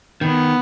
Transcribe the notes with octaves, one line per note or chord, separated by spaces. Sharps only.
D#3 B3